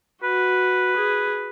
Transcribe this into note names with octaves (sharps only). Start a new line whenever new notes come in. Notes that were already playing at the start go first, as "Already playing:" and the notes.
F#4 B4
G#4